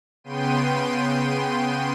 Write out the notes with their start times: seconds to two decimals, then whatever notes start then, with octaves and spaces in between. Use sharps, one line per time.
0.24 C#3 B3 G5 C6 D#7